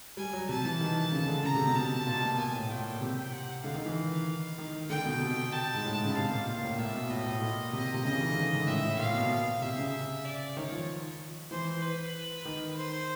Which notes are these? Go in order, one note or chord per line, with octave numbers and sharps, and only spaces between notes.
G3 G#5
F#3
C3 A5
E3
D#3
C#3
C#3
D3
C#3 A#5
C3
B2
C3 A5
B2
A#2
B2
A#2 G#5
A2
A#2 G5
C3
F#5
D3 F5
D#3
E3
D#3
D3 G5
B2
C3
A5
G#2
A2
C#3
C3 F5
A#2
A#2
A2
A#2 E5
B2
A2 D#5
A2
A#2
C3 D#5
C3
C#3 D#5
E3
D#3
D3
C#3
G#2
A2 E5
A2
A#2 F5
B2
C3 E5
C#3
D5
D#3 C#5
F3
E3 C5
B4
D#3
C5